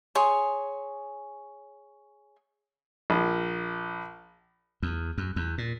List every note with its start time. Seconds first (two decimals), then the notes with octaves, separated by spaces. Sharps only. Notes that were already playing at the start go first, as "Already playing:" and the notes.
0.15 G#4 C#5 C6
3.10 A#1
4.82 E2
5.18 F#2
5.36 E2
5.58 A#2